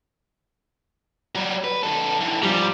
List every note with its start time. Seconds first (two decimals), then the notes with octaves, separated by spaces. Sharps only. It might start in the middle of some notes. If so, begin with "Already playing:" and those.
1.35 F#3 G3
1.64 B4
1.83 D#3 A4
2.21 D3 E3
2.43 G#2 F3 G3